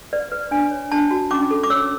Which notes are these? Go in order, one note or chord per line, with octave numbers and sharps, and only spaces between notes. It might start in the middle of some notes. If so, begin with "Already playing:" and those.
B4 D5
B4
D4 G#5
C#5
D4 A5
F#4
C#4 D6
A4
D6
C#5 E6